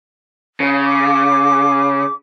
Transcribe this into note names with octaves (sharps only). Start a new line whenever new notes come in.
C#3
D6